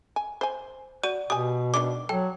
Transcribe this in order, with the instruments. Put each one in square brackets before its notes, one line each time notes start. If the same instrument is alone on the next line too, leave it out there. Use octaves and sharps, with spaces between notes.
[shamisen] G#5
C5 G#5
[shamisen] F#4 [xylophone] D5 D#7
[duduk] B2 [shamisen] G4 G#5 [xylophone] D#6
[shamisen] D#3 D4 D5 [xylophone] D6
[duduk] F#3 [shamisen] A4 [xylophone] G5